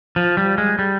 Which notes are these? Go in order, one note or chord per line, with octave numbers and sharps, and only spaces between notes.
F3
G3
G#3
G3